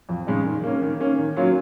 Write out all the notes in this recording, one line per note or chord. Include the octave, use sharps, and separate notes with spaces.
F2
C#3 G#3 D#4
D#3
A#3 C#4
D#3
A#3 C#4
D#3
F#3 A#3 C#4 F4